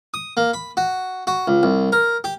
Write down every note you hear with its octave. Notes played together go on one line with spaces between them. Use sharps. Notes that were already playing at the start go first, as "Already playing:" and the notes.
D#6
A#3
B5
F#4
F#4
C#2
C2
A#4
G4